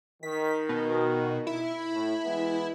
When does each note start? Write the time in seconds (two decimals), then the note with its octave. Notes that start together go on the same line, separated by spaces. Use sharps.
0.23 D#3 B6
0.69 B2
1.47 E4
1.93 A2
2.24 E3 G#3 B3